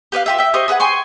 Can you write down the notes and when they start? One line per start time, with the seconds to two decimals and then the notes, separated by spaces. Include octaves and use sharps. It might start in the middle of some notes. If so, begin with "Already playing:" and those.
0.12 G4 B4 D5 F5
0.26 F4 G4 E5
0.38 E5 G5
0.54 G4 C5 D#5 C#6
0.68 G#4 B4 F5 F#5
0.80 G5 G#5 C6 C#6